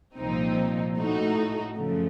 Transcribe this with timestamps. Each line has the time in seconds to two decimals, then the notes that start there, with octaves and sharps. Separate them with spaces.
0.17 C2 A#2 F3 C4 D#4
0.98 A2 A3 D#4 F#4
1.77 F#2 C#3 F3 A3